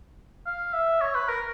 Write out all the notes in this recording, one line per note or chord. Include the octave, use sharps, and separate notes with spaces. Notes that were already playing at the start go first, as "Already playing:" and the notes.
F5
E5
C#5
B4
A#4